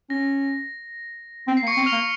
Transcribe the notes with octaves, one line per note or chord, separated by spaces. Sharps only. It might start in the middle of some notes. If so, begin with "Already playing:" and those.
C#4 A#6
C4
C7
A#3
C#6 C#7
C4
F6 F7
A#3